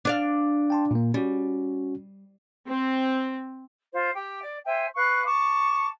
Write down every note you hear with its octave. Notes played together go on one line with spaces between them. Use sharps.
D4 D5 F5
G5 A5 C6
A#2 A#3
G3 C#4 F#4
C4
F4 C5
G4 G5
D5
C5 E5 G5 G#5
B4 F5 C#6 F#6
A5 C#6 D6